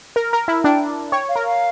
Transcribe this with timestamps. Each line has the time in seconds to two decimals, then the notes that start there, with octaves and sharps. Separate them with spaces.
0.16 A#4
0.33 A#4
0.48 E4
0.64 D4 G5
1.12 C#5 G5
1.29 F5
1.36 A#4
1.44 F5